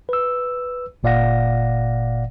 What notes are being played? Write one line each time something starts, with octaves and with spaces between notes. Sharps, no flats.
B4 E6
G1 A#2 D5 F5 F#5 A#6